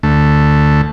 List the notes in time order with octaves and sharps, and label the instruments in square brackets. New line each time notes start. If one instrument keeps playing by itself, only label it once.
[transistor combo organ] D2 A3